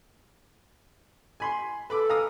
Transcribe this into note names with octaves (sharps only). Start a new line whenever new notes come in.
G#5 B5 C6
A4 B4 B5 D6
F5 A#5 D#6